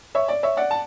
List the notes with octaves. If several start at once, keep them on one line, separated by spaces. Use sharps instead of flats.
C#5 E5
D5
C#5 E5
D5 F#5
A5